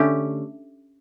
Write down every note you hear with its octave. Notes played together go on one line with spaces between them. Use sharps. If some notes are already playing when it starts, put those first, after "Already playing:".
Already playing: D3 A3 C#4 G4